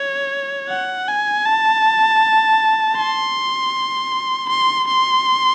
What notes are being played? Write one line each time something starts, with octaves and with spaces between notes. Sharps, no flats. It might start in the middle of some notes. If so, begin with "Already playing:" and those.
Already playing: C#5
F#5
G#5
A5
C6
C6
C6